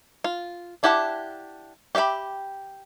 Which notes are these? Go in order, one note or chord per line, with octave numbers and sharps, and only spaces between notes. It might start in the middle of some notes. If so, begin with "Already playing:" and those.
F4
D4 E4 G4 F#5 A5
G4 D#5 E5 G5 B5